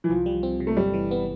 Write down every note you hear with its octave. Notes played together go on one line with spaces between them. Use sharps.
E3
C2 F3
G3
C4
C3
A3
G1 G3
E3
B3